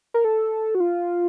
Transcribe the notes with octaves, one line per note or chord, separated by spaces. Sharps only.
A#4
A4
F#4
F4